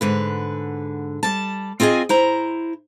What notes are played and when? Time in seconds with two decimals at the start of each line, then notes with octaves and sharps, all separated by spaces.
0.01 G#2 D3 B4
1.23 G3 A5
1.80 C4 F4 G#4 D#5 G#5
2.09 E4 C5 A#5